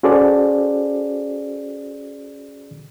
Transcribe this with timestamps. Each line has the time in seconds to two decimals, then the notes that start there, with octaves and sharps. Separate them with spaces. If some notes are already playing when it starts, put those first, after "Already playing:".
0.03 C#4 F#4 G#4 A4 C5 D5